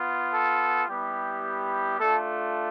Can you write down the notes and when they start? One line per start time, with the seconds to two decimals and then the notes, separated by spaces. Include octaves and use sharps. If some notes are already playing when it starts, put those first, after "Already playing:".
Already playing: B3 F4
0.32 A4
0.88 G3 B3 E4 G4
1.99 A3 D4 F4 A4